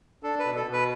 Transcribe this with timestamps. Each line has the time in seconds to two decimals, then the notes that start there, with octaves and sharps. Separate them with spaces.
0.23 D4 A4
0.39 B4
0.45 B2
0.56 A4
0.67 B2
0.73 B4